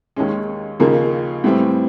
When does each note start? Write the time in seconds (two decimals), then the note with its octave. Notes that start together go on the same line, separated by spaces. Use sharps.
0.16 D#2 D#3 G#3 C#4
0.79 D#2 C#3 F3 A#3 D#4
1.44 A2 E3 G3 C4